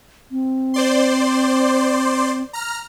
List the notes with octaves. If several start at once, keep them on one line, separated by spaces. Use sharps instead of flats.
C4
C5 D5 C6
A#5 F6